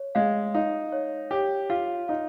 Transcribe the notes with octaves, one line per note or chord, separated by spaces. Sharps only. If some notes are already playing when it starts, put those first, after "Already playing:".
Already playing: C#5
G#3 F5
D#4 F5
C#5
G4 C#5
F4 F5
D#4 F5